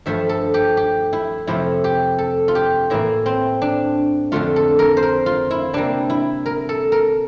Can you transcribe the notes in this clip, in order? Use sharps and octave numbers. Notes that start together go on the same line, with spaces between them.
G2 F3 A3 E5
A4
G4
G4
E4
F2 C3 F3 A3 E4
G4
A4
F4
G4
A2 E3 A#3 E4
C4
D4
F2 D3 A3 F4
A4
A#4
C5
A#4
F4
E4
C3 G3 A#3 D4
E4
A#4
A4
A#4